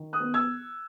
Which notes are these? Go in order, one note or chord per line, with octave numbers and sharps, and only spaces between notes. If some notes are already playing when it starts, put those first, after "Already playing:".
Already playing: D#3
D#6 F#6
B3
E6 G#6